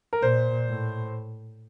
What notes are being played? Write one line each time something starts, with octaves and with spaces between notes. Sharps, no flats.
A#4
A#2 C5
A2